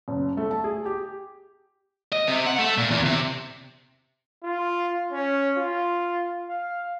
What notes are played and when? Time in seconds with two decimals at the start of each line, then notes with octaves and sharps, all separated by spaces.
0.08 F#1
0.37 A3
0.51 A5
0.64 G#4
0.85 G4
2.13 D#5
2.28 C3
2.47 F#5
2.59 A3
2.78 A#2
2.91 E2
3.05 C3
4.43 F4
5.12 C#4
5.57 F4
6.49 F5